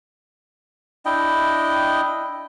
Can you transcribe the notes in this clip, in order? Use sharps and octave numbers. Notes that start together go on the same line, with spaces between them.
D4 E4 D#5 G5